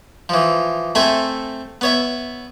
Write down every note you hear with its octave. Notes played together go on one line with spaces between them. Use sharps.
E3 F3
A3 C4 A4 E5 G#5
B3 C#5 E5